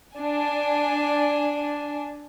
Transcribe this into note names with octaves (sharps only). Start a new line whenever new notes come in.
D4 G#5